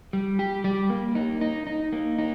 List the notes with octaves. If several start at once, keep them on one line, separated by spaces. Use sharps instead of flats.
G3
G4
G3
A#3
D#4
D#4
D#4
A#3
D#4